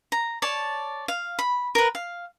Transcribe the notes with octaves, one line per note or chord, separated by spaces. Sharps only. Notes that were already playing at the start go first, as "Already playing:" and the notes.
A#5
C#5 D5 A5
F5
B5
A#4 B4
F5